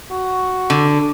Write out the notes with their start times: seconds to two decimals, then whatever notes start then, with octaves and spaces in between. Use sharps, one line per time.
0.11 F#4
0.70 D3